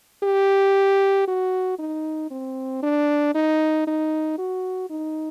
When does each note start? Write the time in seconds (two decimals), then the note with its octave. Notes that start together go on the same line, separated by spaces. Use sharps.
0.23 G4
1.28 F#4
1.79 D#4
2.31 C4
2.83 D4
3.35 D#4
3.87 D#4
4.38 F#4
4.90 D#4